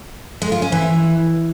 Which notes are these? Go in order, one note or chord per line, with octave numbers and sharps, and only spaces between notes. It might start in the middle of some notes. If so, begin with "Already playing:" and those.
G#3
F4
C#4
E3